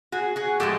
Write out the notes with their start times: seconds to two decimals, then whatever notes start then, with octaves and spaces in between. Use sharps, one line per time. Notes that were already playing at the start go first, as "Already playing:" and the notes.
0.12 F#4 G#4
0.36 F#4 G#4
0.60 A2 F3 G#3 G4 A4